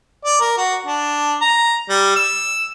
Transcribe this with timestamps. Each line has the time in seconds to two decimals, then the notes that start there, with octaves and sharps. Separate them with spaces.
0.25 D5
0.40 A#4
0.57 F#4
0.86 D4
1.41 A#5
1.89 G3
2.16 E6